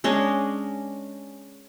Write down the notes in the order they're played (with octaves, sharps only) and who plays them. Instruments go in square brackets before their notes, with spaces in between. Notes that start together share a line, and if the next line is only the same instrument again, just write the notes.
[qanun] G#3 C#4 D4 D#5